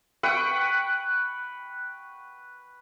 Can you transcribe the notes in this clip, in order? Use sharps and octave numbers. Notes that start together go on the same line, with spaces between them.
B4 F#5 G5 C#6